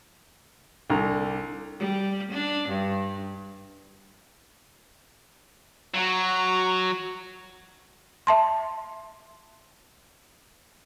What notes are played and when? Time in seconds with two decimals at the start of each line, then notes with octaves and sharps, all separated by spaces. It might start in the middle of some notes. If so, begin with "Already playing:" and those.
0.90 C2 D3 A#5
1.79 G3
2.32 D4
2.69 G2
5.95 F#3 F#4 A#5
8.27 E5 A5 C6